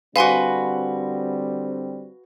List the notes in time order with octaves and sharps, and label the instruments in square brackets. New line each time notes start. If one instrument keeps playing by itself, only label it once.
[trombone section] D3 G3 C4 [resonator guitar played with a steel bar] F#4 B4 [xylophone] F5 G#5 C6